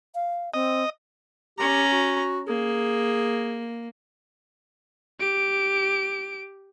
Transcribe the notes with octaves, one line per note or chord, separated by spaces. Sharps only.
F5
C4 D#5
C#4 G4 A#5
F#4
A#3 G#4
G4 D7